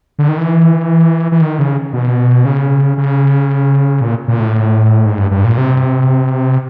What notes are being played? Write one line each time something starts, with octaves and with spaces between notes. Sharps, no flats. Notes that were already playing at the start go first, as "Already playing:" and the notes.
D3
D#3
E3
E3
D#3
C#3
B2
C#3
C#3
A#2
A#2
A2
G#2
G2
G2
A#2
C3